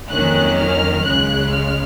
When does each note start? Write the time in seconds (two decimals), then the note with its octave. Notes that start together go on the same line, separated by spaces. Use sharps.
0.10 F2 D#3 F#3 A#3 C#4 F#6
0.58 F6
1.04 C#2 C#3 G#3 F#6
1.52 F6